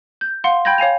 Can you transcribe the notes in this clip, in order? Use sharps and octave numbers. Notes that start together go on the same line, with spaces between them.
G6
F5 F#5 C6
G5 B5 G6 G#6 A#6
C#5 F5 G#5 F7